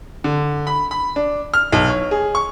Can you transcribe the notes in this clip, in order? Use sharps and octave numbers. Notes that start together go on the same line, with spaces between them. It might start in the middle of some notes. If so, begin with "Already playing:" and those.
D3
B5
B5
D4
F6
B1
C#5
G#4
C#6